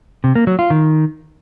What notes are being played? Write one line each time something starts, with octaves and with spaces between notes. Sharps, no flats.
C3
A#3
F#3
F4
D#3